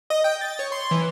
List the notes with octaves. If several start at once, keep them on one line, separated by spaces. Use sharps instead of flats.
D#5
G5
A6
C#5
C6
E3